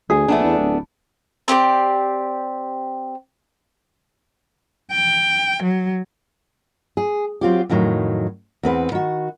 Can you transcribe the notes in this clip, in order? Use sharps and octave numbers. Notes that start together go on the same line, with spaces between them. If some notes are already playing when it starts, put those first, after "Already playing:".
D2 G#4
A#1 A3 B3 D4
E2
D1
C4 G4 B4 D5
G5
F#3
G#4
F#3 C4 F4 G4
F2 A2 D#3 F#3
E2 C4 B4 F#5
D#3 F#4